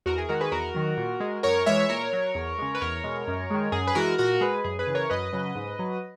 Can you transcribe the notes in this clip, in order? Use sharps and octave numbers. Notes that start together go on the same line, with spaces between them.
E2 F#4 A#4
G#4
D#3 G#3 F#4 A#4
G#4 B4
E2 F#4 A#4
D#3 F#3
A#2
G#3
F#2 A#4 C#5
E3 G#3 C#5 E5
A#2 A#4 C#5
F#3
E2
C#3 G#3
B4
E2 A#4 C#5
B2 G#3
F#2
D#3 G#3
F#2 G#4
B4
E3 G#3 F#4 A#4
A#2 F#4 A#4
G#3 G#4 B4
F#2 G#4
G#4 B4
C#3 E3
A#4 C#5
F#2 B4 D#5
C#3 F#3
G#2
F#3